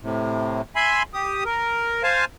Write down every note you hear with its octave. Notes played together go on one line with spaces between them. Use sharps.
A2 C3
E5 G#5 B5 C6
G4 D#6
A#4
C5 F5 G#5 A5